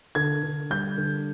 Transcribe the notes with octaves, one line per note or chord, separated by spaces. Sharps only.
D3 G#6
D3
G3 G6
D3